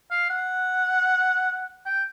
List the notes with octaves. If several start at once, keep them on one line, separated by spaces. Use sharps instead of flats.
F5
F#5
G5